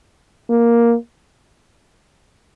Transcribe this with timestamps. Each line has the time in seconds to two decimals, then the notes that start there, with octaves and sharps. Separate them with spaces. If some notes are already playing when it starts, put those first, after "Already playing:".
0.49 A#3